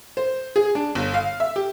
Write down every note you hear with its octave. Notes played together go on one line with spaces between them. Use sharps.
C5
G#4
D4
G1
F5
E5
G4